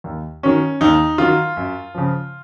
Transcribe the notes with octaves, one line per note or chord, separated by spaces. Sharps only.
D#2
D#3 F#3 C#4
D#2 D#4
D#3 F#3 F4
F#2
C#3 F3